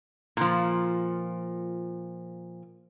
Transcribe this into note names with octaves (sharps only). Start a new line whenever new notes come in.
A#2 F3